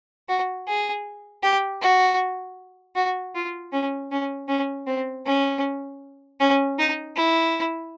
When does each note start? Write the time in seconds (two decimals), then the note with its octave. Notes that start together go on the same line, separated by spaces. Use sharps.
0.29 F#4
0.67 G#4
1.43 G4
1.81 F#4
2.96 F#4
3.35 F4
3.72 C#4
4.11 C#4
4.48 C#4
4.87 C4
5.26 C#4
6.40 C#4
6.79 D#4
7.16 E4